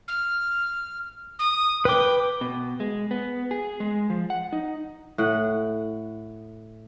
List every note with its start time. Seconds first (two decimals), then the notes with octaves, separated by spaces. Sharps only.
0.08 F6
1.39 D#6
1.85 B4 G5 D6
2.41 B2
2.80 G#3
3.11 B3
3.51 G#4
3.80 G#3
4.10 F3
4.30 F#5
4.53 D#4
5.18 A2 F#5